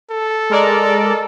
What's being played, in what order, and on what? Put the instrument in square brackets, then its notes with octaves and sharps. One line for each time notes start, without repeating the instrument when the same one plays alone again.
[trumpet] A4
[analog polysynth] G#3 A#4 D5